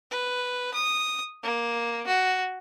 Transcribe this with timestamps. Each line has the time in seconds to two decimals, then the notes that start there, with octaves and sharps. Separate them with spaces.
0.11 B4
0.74 D#6
1.44 A#3
2.07 F#4